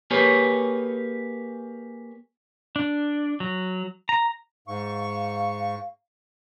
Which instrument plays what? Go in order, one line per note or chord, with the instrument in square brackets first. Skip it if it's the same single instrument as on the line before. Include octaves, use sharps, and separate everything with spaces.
[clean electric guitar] A#3 G4 G#4 B4 C#5
[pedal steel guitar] D4
F#3
A#5
[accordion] G#2 C#6 [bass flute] F5